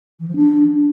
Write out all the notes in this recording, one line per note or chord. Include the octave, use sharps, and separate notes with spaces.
E3
F3
D4